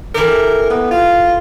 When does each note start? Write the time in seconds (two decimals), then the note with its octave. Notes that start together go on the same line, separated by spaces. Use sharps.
0.15 E3 A3 G4 A#4
0.70 B3
0.91 F4